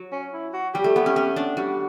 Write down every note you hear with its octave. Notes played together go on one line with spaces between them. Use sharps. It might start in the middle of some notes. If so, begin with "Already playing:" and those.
Already playing: F#3
C#4
E4
F#4
G3 G4
A3
B3
C#4
C#4
D4
G3 F#4